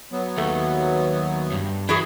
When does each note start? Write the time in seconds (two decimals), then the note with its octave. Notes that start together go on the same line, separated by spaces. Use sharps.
0.12 F#3 B3
0.38 D#2 A3
1.52 G2
1.89 E3 E4 F#4 G#4 E5